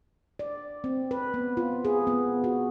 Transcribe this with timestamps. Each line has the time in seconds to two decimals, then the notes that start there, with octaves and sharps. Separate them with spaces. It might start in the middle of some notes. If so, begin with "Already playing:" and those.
0.39 D5
0.84 C4
1.11 B4
1.34 B3
1.57 F4
1.85 G#4
2.07 B3
2.44 F#4